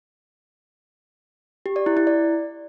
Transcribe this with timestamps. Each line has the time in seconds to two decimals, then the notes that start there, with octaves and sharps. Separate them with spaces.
1.66 G4
1.76 D5
1.86 E4
1.97 E4
2.07 D5